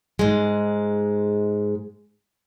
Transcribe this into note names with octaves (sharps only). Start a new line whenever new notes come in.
G#2 G#3